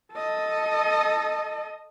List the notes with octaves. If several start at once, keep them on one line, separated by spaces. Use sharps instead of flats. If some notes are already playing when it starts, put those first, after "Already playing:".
A4 D#5